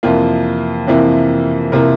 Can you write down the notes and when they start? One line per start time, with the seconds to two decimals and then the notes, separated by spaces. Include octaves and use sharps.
0.03 F2 C3 E3 A#3 F4
0.87 F2 C3 E3 A#3
1.72 C3 E3 A#3 A#4